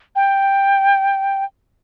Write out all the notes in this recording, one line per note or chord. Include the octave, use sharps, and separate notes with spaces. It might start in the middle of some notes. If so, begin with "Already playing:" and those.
G5